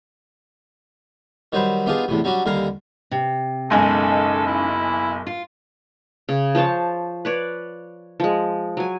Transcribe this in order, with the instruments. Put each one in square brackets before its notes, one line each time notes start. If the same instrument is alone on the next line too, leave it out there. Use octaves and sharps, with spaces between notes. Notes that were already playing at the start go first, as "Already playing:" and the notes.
[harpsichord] D#3 F#3 G3 B4 C5
B3 D4 D#4 F4 G4 G#4
E2 A2 C3
F#3 G3 C#4 D4 F#4
D#2 D3 G3 A#4 F5 A#5
[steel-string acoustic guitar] C3
[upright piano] F#1 B1 G#5 [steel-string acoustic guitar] C#3 G#3 D#4 [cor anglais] A4
[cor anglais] E4
[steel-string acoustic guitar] F4
[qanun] C#3
F3 C5 C#5 A5
B4 C#5 D5
F3 G#3
F#3 G#5